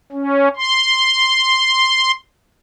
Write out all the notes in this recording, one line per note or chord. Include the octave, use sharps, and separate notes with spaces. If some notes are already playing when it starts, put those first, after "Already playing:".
C#4
C6